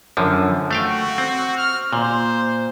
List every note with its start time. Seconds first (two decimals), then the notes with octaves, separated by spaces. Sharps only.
0.17 F#2 D3 F3
0.71 A3 F#4 F5 G5
1.18 C4
1.57 F6
1.93 A#2 C5